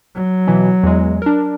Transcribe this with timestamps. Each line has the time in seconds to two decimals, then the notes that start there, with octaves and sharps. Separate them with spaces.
0.15 F#3
0.47 B2 E3
0.83 E2 G#3
1.22 D4 A#4